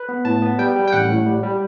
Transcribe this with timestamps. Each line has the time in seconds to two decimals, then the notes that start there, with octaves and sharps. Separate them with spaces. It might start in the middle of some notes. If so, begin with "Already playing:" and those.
Already playing: B4
0.09 B3
0.25 A2 A5
0.42 B3
0.58 G3 G5
0.76 G3
0.88 G5
0.93 A1 F#5
1.10 A2
1.26 G3
1.43 G3